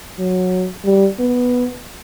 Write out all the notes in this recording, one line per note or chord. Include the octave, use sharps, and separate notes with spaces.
F#3
G3
B3